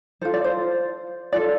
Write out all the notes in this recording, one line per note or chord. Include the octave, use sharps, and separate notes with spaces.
F4 A4 C5
D5
C5
F4 A4 D5